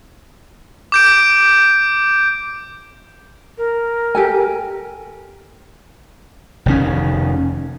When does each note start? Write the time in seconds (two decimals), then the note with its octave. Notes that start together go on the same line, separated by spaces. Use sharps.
0.92 D6 G6 D7
3.58 A#4
4.15 G4 A4 G#5
6.66 F1 D#3 C#4